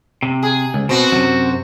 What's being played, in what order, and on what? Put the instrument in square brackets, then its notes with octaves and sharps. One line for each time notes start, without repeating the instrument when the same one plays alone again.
[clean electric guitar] C3
[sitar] G#4
[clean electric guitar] C#2
[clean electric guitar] B2 [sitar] C4 F#4
[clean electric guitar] F#2 C3